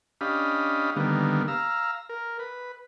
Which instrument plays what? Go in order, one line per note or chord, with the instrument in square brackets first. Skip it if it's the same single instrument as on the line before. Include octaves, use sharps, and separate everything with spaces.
[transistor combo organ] C#4 D4 G4 D#5 F5 B5
D3 D#3 G3 A#3 B3
F5 A#5 E6
A#4
B4